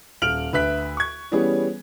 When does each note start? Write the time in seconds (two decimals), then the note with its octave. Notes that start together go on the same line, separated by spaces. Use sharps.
0.22 D#1 F6 D7 F7 F#7
0.53 D2 B4 E5 F#6 B6
0.97 C#6 G#6
1.32 E3 G3 B3 C#4 G#4 C#5